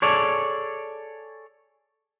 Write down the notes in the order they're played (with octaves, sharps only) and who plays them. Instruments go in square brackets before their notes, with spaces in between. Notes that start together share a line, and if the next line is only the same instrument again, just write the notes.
[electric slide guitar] G#4 A4 C#5 D5